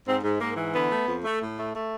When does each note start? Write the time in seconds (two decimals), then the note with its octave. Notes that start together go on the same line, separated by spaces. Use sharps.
0.07 G#2 C4
0.24 G#2
0.41 G#2 A#3
0.57 E3
0.73 D3 B3
0.90 A3
1.07 F2
1.23 A3
1.40 A2
1.57 A3
1.73 A3